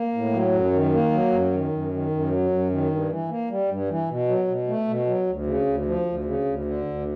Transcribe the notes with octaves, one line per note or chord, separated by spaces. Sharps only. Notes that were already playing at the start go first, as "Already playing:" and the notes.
Already playing: A#3
A2
F#3
F#2
D#3
A#3
F#3
F#2
D#3
F#2
D#3
F#2
F#3
F#2
D#3
G2
E3
A#3
G3
G2
E3
B2
F#3
B2
A3
B2
F#3
D2
C#3
D2
F3
D2
C#3
D2
D3
D2